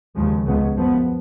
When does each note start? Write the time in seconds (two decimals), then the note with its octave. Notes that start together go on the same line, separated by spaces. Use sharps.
0.15 D#2 C#3 F3 G#3
0.45 C#2 C#3 G#3 B3
0.76 F#2 F3 B3